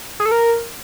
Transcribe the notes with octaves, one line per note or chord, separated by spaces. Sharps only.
G#4
A4
A#4